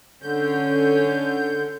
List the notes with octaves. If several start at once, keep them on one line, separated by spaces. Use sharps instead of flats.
D3 C#4 G6